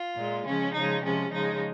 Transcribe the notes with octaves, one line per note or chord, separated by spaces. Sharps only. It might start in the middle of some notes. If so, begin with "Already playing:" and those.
Already playing: F4
A#2 G#3
C#3 F3 G#3 C#4
C#3 F3 G#3 D#4
C3 F3 G#3 C#4
C#3 F3 G#3 D#4